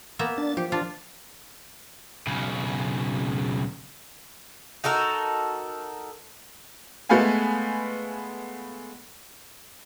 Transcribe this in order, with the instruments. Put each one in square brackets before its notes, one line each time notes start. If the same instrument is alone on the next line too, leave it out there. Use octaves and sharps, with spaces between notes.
[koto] A#3 B3 E5
[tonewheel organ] D4 A6
[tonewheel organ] F3 [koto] G4
[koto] D4 F4
[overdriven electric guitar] B1 C#3
[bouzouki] D#4 F#4 A4 A#4
[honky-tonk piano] G#3 A3 B3 B4 F5 G#5